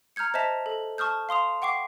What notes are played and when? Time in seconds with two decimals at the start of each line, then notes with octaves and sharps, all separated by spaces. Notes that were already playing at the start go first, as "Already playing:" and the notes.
0.16 A#5 F6 G6 G#6 C#7
0.34 C5 D#5 E5 A5 B6 F7
0.66 A4
0.98 A5 C#6 D#6 F6 G6
1.29 F5 C6 D#6 F7
1.62 F#5 G5 C#6 D6 C7